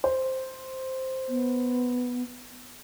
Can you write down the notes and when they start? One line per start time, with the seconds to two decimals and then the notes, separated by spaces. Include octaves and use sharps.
0.04 C5
1.29 B3